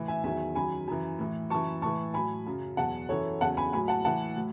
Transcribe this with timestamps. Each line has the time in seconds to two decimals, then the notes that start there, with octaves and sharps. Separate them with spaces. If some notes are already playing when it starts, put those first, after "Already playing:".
Already playing: A2 E3
0.08 E5 G#5
0.24 E2 D#3 F#3 E5 G#5
0.55 F#2 D#3 F#3 G#5 B5
0.88 F#2 E3
1.19 A2 E3
1.50 F#2 E3 A5 C#6
1.82 A2 E3 A5 C#6
2.14 A2 F#3 G#5 B5
2.47 F#2 C#3 F#3
2.77 E2 B2 F#3 F#5 A5
3.09 F#2 E3 A4 C#5
3.41 E2 C#3 F#3 F#5 A5
3.57 G#5 B5
3.73 A2 F#3 G#5 B5
3.88 F#5 A5
4.05 A2 E3 F#5 A5
4.36 A2 F#3